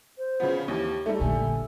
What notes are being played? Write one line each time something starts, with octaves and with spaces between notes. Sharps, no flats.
C5
C#3 F3 B3
D#2 E3 G4
G3 A3 D#4 G4 A4 E5
A#1 D3 G#5